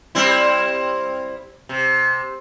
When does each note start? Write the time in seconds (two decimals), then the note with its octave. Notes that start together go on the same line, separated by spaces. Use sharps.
0.15 G3 C4 E4
1.69 C3